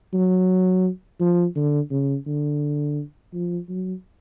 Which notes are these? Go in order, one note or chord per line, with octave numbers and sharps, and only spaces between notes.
F#3
F3
D3
C#3
D3
F3
F#3